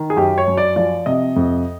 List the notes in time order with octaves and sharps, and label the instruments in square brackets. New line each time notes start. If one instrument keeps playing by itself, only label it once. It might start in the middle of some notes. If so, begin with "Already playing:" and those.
Already playing: [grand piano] D#3
G#4
F#2 G4
C#5
F#2
D5
F3 D5
C3 D#5
F2